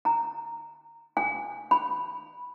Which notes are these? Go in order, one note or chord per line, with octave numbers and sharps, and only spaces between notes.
A#5
G#5
B5